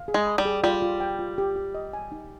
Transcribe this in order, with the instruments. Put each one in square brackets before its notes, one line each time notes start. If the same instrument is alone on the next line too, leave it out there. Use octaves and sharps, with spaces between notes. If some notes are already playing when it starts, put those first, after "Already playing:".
Already playing: [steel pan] F5
G#4
[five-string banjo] G#3
[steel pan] B5
[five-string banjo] G3
[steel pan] G#4
[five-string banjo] G3 [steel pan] F4
[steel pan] F4
G5
F4
G4
G4
D#5
G#5
D#4